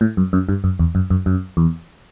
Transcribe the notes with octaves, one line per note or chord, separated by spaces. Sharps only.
A2
F#2
F#2
G2
F#2
E2
F#2
F#2
F#2
E2